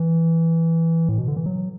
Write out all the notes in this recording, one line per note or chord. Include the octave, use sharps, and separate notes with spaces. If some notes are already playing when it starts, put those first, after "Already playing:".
Already playing: E3
A2
B2
D3
E3
F#3